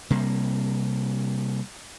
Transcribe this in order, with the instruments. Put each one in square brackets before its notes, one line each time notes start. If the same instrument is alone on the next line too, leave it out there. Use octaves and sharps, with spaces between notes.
[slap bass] C3 G3 A#3